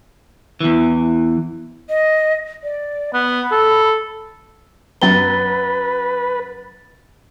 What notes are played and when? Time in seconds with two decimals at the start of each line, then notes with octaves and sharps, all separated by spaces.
0.60 E2 E3
1.89 D#5
2.64 D5
3.14 B3 B5
3.52 A4
5.02 F#2 B4 A#5 A6 G7